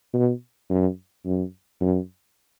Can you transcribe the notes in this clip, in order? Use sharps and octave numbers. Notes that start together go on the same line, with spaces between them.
B2
F#2
F#2
F#2